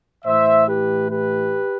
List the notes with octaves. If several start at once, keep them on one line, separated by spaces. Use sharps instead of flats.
A2 E3 C5 E5
G4 B4
G4 B4